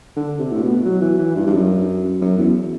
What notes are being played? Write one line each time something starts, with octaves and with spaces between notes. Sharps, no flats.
D3
C3
A2
B2
F#3
E3
E3
G2
G2
F#2
F#2
E2